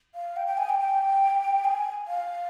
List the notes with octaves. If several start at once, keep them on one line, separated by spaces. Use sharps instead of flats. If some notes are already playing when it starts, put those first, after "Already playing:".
F5
G5
G5
G#5
G5
G5
G#5
F5